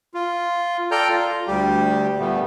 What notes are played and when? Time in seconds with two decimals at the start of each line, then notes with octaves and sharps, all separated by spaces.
0.14 F4
0.91 A4 D5 G5 A#5 F6 G6
1.08 F4
1.47 D2 G3 G4
2.19 A#2 G3 A3 B3